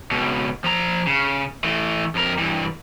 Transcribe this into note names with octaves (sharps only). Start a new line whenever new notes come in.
C#2 B2
F3 A#5
C#3
E3 A3
F2 A#4
G2 E3